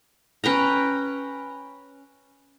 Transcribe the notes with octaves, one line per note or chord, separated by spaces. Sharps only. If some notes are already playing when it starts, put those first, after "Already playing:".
C#4 B4 G5 A#5